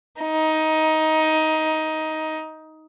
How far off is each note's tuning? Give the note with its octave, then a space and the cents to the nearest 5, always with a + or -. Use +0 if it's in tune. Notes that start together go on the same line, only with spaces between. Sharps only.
D#4 +15